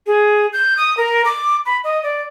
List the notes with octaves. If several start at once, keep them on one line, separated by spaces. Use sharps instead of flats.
G#4
G6
D#6
A#4
D6
B5
D#5
D5